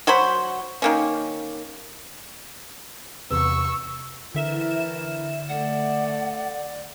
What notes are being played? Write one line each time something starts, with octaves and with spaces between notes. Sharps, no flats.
F#3 F#4 C5 B5
D#3 A#3 C#4
E2 C3 B3 C#6 E6
D3 E3 E4 A#4 E5 E7
A3 D5 F#5